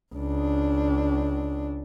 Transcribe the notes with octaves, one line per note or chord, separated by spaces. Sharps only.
C#2 D4